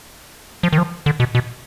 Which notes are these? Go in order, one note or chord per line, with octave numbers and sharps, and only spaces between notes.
F3
D#3
F3
D3
B2
B2